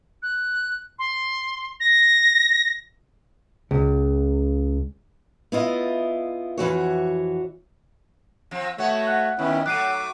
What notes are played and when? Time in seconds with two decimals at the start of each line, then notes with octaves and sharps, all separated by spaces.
0.23 F#6
0.99 C6
1.80 A#6
3.71 C#2
5.52 B3 E4 F4 D#5
6.58 F2 E3 F#4 C#5
8.51 F3 C4
8.78 A3 B3 F#4 C#5
9.07 F#5 F#6
9.39 D#3 B3 C#4 E4
9.66 F#3 A3 D6 F#6 C7 D#7